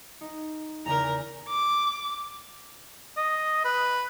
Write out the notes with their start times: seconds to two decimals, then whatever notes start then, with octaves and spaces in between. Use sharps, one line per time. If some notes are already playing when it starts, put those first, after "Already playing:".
0.21 D#4
0.85 E2 C#3 A#4 A#5
1.49 D6
3.17 D#5
3.65 B4